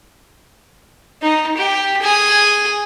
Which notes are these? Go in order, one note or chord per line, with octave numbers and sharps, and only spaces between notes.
D#4
G4
G#4